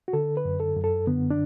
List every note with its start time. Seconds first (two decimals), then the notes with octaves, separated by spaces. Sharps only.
0.08 F#4
0.13 D3 A4
0.37 B4
0.45 F#2
0.60 A4
0.76 F#2
0.84 A4
1.07 D3 B3
1.30 D4